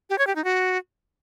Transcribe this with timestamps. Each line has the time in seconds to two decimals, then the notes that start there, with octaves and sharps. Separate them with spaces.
0.10 G4
0.18 C#5
0.27 G4
0.36 D#4
0.44 F#4